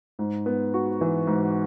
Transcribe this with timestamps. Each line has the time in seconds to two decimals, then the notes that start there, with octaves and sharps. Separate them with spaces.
0.19 G#2
0.46 B3
0.74 F#4
1.01 E3
1.27 G#2